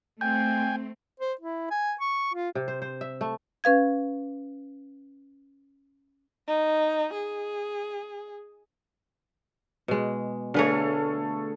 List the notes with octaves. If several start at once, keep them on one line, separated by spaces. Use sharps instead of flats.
A3 C4 G5 G#5 G6
C5
E4
G#5
C#6
F4
C3
C5
C5
E5
A3
C#4 B4 F5 G#6
D#4
G#4
B2 G#3
D3 A3 G#4 B4 C#5 F5